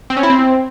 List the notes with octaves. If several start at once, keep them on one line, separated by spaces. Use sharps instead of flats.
C4
C#4
E4
C4